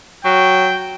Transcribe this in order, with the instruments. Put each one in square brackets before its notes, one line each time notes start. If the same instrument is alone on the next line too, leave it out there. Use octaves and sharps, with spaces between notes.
[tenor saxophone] F#3 [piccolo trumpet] G5